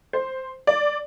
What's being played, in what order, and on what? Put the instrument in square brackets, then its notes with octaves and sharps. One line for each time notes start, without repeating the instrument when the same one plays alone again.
[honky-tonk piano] C5
D5